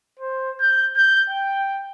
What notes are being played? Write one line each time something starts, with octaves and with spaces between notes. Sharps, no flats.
C5
G6
G6
G5